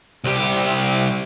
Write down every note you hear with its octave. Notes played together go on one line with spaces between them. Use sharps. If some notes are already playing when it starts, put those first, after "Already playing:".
C2 G4